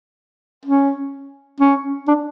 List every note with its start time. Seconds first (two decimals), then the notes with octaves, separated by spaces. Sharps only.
0.66 C#4
1.60 C#4
2.08 D4